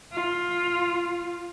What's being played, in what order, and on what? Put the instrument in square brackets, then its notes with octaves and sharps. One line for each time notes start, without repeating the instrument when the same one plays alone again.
[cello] F4